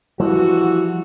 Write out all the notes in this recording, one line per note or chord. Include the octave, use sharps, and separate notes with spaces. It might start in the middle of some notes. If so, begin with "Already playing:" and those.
E3 F3 G3 F#4